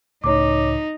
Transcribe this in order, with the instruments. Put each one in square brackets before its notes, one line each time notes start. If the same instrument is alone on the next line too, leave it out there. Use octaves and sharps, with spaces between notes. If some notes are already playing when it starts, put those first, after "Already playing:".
[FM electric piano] C#2 A2 C#3 [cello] D#4 [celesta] C#5 D6